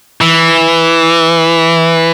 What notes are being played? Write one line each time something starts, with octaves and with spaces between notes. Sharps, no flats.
E3